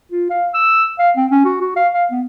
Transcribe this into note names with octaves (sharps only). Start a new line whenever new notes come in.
F4
F5
E6
F5
C4
C#4
F#4
F#4
F5
F5
B3